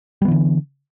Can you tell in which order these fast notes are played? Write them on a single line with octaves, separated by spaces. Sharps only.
G3 B3 E3 D3